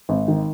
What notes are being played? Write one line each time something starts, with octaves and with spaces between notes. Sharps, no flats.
G#1
D#3